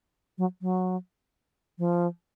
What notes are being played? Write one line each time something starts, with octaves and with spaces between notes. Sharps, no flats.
F#3
F#3
F3